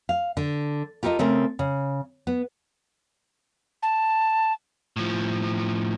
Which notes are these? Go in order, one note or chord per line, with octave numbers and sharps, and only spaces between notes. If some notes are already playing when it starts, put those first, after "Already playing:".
F5
D3
F4 G4 A4 A#4 D#5
C#3 A3 C4 G#4 A#4
C#3
B3
A5
A2 F3